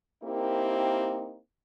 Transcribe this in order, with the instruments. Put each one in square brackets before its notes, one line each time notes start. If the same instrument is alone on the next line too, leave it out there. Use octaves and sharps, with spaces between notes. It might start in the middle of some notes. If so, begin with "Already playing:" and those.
[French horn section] A#3 C4 D#4 E4 G4 A#4